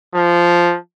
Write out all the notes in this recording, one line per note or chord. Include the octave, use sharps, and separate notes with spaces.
F3